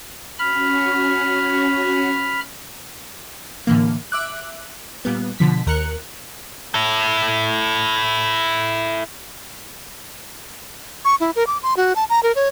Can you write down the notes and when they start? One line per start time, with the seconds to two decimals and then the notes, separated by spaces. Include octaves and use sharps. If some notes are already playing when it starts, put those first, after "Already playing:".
0.39 C#4 F#4 B5 F6
3.67 A2 D3 E3 A#3
4.12 E5 D6 F#6
5.05 A#2 G3 B3
5.39 B2 D3 F3 B6
5.67 D#2 A#4 F#6 C#7
6.74 E4 A4
11.05 C#6
11.20 E4
11.36 A#4
11.47 D6
11.63 C6
11.77 F#4
11.96 A5
12.10 A#5
12.23 A#4
12.36 C#5